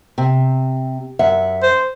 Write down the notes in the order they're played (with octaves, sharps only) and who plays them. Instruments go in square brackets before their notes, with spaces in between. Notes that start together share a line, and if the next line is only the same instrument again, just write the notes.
[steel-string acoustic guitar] C3
F#2 E5 F#5
[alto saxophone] C5